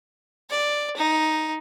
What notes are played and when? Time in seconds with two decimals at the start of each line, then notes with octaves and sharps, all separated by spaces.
0.50 D5
0.97 D#4